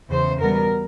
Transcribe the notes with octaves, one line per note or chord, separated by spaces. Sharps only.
E2 C#3 E3 C5
E2 B2 G3 B3 A#4